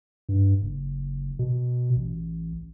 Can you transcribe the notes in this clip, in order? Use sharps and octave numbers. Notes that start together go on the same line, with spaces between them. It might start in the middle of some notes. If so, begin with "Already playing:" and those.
G2
F#1
B2
A1